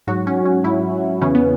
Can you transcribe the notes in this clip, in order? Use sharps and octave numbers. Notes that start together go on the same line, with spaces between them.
G#2 F#3 F#4
C#4
C#4
G#2 F#3 E4
E2 C#3 E3 C#4
B3